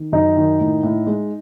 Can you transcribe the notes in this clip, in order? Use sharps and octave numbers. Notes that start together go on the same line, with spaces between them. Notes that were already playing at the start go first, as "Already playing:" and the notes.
Already playing: D#3
F#2 D#4
D#3
A2
A2
G#3